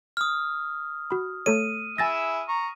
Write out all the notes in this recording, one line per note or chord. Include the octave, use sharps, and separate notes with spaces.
D#6 F6
F#4 B5
A3 A4 C#5 D#7
E4 G#4 E5 G#5 A6 A#6
A#5 C#6